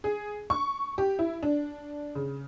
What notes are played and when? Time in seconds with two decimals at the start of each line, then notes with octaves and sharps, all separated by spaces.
0.04 G#4
0.50 C#6
0.98 G4
1.19 E4
1.43 D4
2.15 C#3